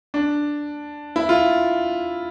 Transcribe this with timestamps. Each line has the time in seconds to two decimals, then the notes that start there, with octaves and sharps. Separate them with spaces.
0.14 D4
1.16 E4
1.29 F4